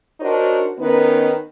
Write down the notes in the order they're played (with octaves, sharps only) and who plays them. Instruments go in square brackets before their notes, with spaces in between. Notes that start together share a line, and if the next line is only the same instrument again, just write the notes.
[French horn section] D4 D#4 F#4 A#4 C5 C#5
D#3 B3 C#4 D#4 A#4 B4